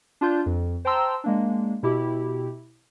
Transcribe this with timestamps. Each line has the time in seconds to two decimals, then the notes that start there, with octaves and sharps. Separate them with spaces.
0.21 D4 F4 G6
0.46 F2
0.85 C5 G5 A5 A#5 C6 E6
1.24 G#3 A#3 D4
1.83 B2 E4 G4